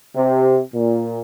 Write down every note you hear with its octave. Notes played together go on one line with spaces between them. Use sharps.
C3
A#2